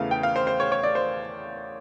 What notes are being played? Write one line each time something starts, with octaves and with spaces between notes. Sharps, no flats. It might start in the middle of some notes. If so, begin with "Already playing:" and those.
Already playing: E2 C#3 E3 A3 F5
G5
F5
C5
C5
C#5
C#5
D5
C5